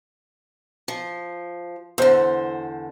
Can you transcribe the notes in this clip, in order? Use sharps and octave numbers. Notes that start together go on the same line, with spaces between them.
F3
E2 D3 C5